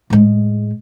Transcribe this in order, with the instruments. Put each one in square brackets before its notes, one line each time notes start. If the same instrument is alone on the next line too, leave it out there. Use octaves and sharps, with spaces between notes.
[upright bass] A2 G#3